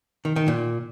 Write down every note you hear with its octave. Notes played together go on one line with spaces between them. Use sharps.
D#3
D#3
A#2